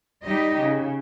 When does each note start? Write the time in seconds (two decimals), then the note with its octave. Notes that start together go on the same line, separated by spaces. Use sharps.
0.24 G3 D#4 G4 D#5
0.59 C#3